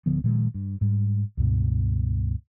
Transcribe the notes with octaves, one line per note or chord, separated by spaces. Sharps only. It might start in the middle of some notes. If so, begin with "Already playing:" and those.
D1 D3 F3 B3
A#2 D#3 F3 G#3
G2
G#2 G3
C#2 G2 B2